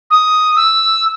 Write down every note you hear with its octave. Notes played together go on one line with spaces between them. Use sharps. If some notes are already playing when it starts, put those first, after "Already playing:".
D#6
E6